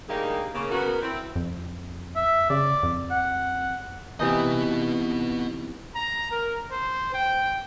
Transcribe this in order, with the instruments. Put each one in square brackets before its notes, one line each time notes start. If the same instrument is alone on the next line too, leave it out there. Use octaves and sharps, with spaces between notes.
[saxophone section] D2 G3 A#3 D#4 G4 G#4
C#3 A#3
C#3 B3 F#4 A#4
C4 E4
[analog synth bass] F2
[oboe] E5
[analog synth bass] C#3 [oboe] D5
[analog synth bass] F2
[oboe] F#5
[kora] C3 E3 D#4 [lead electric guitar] B3 D#5
[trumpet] A#5
A#4
C5
G5